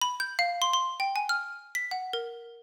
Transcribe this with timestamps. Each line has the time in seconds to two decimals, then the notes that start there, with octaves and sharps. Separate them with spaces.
0.02 B5
0.20 G6
0.39 F5
0.62 C6
0.73 C6
1.00 G5
1.16 G#5
1.29 F6
1.75 B6
1.91 F#5
2.13 A#4